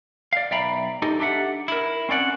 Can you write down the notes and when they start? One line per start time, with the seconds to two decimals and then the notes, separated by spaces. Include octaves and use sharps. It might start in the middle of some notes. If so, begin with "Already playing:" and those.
0.33 D5 F5
0.51 B1 D5 E5 G5 A#5 B5
1.02 D#4 G4 A4 D#5
1.19 D4 G4 A4 E5 F#5
1.68 E4 A#4
2.09 C4 C#4 D5 F#5